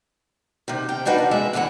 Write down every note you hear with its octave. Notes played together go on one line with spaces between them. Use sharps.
C3 D#3
G5
A#3 D4 D#4 F#4 B4
E2
G#3 E5
E2 D3 E3 F5 F#5